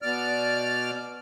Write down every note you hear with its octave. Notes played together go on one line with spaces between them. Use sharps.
B2 D5 F6